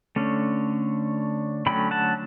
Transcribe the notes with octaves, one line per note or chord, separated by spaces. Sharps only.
D3 A3 C#4
D3 F#3 A3 C#4 G5 B5
F#5 A5